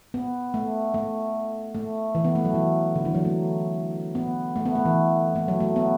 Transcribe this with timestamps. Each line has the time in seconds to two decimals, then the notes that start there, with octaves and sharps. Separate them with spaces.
0.14 B3
0.54 A3
0.94 A3
1.75 A3
2.15 E3
2.25 B3
2.35 A3
2.45 F#3
2.55 E3
2.95 D3
3.05 E3
3.15 F#3
3.25 A3
4.15 B3
4.56 A3
4.65 B3
4.75 A3
4.85 E3
5.35 A3
5.48 F#3
5.60 A3
5.76 B3